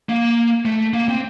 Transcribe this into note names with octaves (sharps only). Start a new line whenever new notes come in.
A#3
A3
A#3
C4